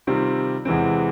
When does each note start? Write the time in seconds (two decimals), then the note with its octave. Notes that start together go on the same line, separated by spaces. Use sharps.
0.07 C3 D#3 G3 C4 F4
0.65 E2 C3 E3 G#3 C4